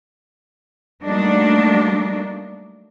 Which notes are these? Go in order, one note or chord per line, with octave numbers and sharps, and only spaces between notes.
F#3 G3 A3 A#3 D4 D#4